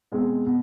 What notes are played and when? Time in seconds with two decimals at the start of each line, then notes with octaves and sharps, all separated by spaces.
0.12 B2 G#3 C4
0.46 B2